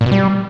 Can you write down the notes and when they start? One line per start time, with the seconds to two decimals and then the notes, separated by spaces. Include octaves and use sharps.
0.01 A#2
0.06 B2
0.12 G3